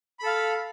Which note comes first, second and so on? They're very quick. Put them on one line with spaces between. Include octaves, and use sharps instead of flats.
B5 A4 F5